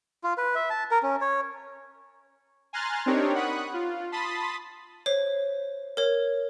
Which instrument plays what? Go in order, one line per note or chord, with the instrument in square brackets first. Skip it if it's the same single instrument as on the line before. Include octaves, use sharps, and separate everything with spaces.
[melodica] F4
B4
E5
A5
A#4
C#4
C#5
[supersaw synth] G#5 A#5 C6 F6 F#6 A6
C4 D4 D#4 G4 A#4 C#5
F#5 B5 C#6 D#6 F#6
F4
A5 B5 C6 D#6 A6 B6
[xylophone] C5 C#5
A#4 C#5